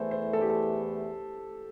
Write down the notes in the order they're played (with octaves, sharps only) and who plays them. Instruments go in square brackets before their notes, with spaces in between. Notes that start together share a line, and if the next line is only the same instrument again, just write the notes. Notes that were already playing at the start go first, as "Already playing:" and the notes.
Already playing: [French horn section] E2 E3 A3 E4 [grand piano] A4 C5
[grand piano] C5
A4
G4
A4